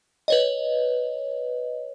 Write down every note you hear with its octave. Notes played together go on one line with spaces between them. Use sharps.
B4 C#5 D#5